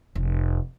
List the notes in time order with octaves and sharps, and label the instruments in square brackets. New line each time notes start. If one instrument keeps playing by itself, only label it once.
[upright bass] F1